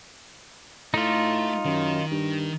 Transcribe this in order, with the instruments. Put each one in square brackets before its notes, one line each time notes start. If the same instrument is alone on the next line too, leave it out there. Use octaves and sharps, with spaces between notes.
[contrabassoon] A2 [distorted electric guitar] A3 [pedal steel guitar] D#4 F4
[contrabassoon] F#2 [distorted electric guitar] D#3
[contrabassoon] G2